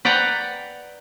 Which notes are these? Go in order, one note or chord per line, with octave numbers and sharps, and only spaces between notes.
B4 D5 F#5 G5 A#5